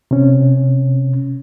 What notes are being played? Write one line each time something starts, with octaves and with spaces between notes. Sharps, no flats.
C3 C#4